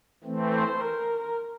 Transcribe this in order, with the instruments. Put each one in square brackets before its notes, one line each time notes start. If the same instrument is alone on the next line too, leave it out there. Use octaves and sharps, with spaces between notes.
[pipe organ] E3 A3 C4
[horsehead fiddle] C5
A#4